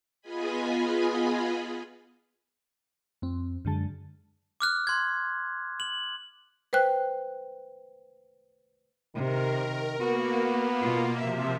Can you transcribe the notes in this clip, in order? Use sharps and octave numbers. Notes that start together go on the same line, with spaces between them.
B3 F4 G#4 D#5 G#5 B5
F2 C4
F#2 D3 G#3 A5
D6 F6 F#6
C6 G#6
F#7
B4 C5 G5 F#6
C3 D#3 A#4
A#3 B3 F#4
B2 F4
C3 F3 E5